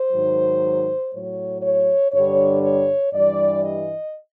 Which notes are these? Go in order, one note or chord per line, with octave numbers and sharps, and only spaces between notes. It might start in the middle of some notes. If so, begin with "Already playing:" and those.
Already playing: C5
G#2 D#3 F#3
A2 F#3 C#5
C#5
G2 D3 G3 C#5
C#5
G2 E3 G3 D5
D#5